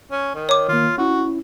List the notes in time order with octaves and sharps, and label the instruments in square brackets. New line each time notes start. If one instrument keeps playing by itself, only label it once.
[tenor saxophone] C#4
D#3
[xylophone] C#5 D6
[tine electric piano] D#3 A#3 [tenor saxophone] F4
[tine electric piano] C#4 E4 [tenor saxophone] F#4